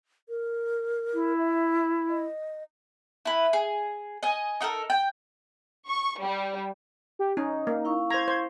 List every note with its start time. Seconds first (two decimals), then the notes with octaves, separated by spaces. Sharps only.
0.29 A#4
1.13 E4
1.38 E5
2.09 D#5
3.25 E4 B4
3.53 G#4
4.23 D#5 G#5
4.61 D#4 G4 A4 A#4
4.90 G5
5.88 C#6
6.21 G3
7.19 G4
7.37 C#4 D#4
7.67 A#3
7.85 E4 F5 C#6
8.10 C5 A#5 G#6
8.28 C5